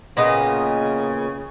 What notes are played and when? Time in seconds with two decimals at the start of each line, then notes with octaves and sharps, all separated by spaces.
0.17 A#2 C#3 B3 D#5